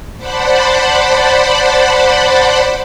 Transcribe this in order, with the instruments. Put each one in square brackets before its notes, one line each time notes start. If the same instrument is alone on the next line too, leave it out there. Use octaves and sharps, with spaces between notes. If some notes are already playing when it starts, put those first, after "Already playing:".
[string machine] C5 D5 F#5 A5 B5